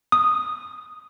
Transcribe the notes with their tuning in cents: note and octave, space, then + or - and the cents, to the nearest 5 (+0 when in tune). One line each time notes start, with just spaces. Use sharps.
D#6 -5